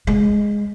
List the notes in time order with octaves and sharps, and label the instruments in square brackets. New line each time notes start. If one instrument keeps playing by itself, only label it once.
[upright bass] G#3